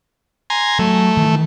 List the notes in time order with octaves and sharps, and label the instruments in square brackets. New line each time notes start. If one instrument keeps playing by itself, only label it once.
[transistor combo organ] G#5 A#5 C6
[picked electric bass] F#3 [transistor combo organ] A3
[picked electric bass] D#3 E3